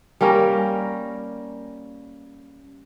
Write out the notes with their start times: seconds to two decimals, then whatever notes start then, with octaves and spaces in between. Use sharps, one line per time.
0.21 G3 A#3 C#4 A#4